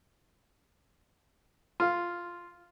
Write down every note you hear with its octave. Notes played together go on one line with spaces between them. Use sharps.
F4